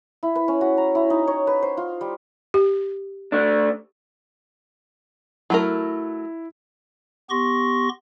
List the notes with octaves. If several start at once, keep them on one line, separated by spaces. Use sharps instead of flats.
E4
B4
C#4
F#4
A#5
E4
D#4
C#5
B4
C5
F4
G3
G4
A3 D4
F#3 A3 E4 A#4
B3 G4 C6 C#6 A#6